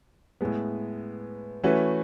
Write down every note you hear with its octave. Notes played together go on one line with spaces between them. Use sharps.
A2 G#3 B3
E3 A3 C#4 F#4 B4